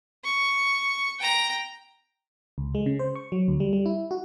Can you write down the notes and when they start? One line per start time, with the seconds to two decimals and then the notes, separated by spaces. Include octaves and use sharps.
0.24 C#6
1.19 G5 A#5
2.58 C#2
2.75 G#3
2.86 C#3
2.99 C5
3.15 C#6
3.32 F#3
3.48 D2
3.60 G3
3.73 G3
3.86 E4
4.11 F#4